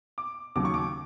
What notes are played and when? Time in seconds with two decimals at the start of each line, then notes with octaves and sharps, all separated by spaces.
0.18 D6
0.56 D#2 C#3 F#3 D6
0.65 C#6
0.74 D6